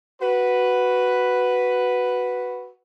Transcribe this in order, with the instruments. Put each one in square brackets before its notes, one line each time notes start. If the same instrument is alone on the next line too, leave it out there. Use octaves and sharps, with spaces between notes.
[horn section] F#4 B4